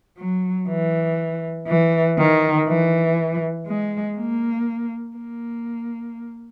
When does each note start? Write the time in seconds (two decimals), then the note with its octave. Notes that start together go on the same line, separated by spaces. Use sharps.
0.18 F#3
0.68 E3
1.67 E3
2.18 D#3
2.67 E3
3.67 G#3
4.17 A#3
5.17 A#3